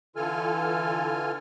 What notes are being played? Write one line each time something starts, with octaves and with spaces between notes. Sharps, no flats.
D3 E3 F4 A4 G#5 F6